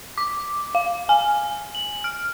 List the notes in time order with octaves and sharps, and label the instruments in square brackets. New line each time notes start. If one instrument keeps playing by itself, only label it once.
[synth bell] D6
F5
G#5
F#7
F6